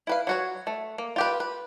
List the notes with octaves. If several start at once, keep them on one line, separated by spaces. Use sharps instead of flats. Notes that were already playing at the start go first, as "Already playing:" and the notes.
E4 B4 F5
F#3 F#4 C#5
A3
A#3
F4 G4 B4
B4